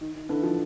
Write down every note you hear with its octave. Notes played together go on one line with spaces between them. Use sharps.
D#3
D#3
D3 E3
D#3 F3